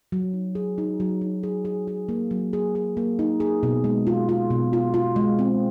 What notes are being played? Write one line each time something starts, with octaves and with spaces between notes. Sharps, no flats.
F#3
D#4
G#4
D#4
F#3
D#4
G#4
G#4
G#4
A#3
F#3
G#4
G#4
A#3
D#4
G#4
B2
G#3
F4
F4
B2
F4
F4
G#3
C4